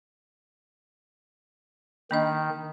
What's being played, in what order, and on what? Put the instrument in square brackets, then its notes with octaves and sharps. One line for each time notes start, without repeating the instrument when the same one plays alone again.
[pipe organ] D#3 [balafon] A#3 D4 D#5